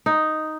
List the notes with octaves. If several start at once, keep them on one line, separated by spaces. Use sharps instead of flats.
D#4